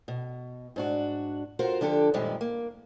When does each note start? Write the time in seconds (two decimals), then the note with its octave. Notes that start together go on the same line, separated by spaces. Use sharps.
0.08 B2
0.76 G#2 D4 F#4
1.59 F4 F#4 A#4 C5
1.81 D3 F3 D4 G4 A4
2.14 F#2 A#2 D#3 F3 G3 G#3
2.41 A#3